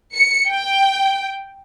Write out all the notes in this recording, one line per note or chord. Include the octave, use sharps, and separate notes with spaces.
C#7
G5